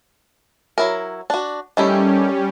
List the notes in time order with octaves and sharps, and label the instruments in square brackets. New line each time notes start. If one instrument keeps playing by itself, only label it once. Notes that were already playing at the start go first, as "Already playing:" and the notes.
[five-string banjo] F#3 E4 A#4
D4 F#4
[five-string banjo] D#3 A3 E4 [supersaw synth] G3 C#4 G4